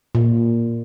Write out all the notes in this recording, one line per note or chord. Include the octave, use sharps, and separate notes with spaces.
A#2